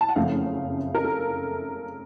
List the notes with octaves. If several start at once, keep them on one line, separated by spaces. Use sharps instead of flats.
A5
F#5
F#1 F2 C#3 F3 A3 F5
A#4
A4